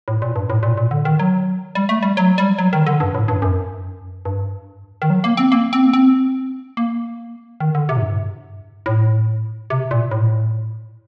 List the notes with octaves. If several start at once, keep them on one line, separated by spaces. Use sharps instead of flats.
A2
A#2
G2
A2
A#2
A#2
D3
D#3
F#3
G3
A3
G3
F#3
G3
F#3
D#3
D3
G2
A2
G2
F#2
G2
D#3
F#3
A#3
C4
A#3
C4
A#3
C4
A#3
D#3
D3
C3
A2
G2
A2
C3
A#2
A2